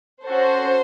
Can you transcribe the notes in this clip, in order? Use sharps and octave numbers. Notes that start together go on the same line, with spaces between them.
C#4 F#4 A4 C5